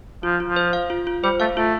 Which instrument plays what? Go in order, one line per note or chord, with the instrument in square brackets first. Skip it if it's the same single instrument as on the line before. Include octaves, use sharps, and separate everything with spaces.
[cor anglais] F3 [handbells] F4
[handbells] F4
[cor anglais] F3
[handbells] C5
F5
F4
F4
[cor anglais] G3 [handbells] C5
[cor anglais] A3 [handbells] F5
[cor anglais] A3 [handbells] F4